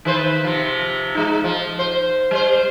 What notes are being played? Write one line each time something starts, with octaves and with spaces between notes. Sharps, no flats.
D#3 B4 C5
C3 F3
G#3 D#4
F3
C5
G3 C5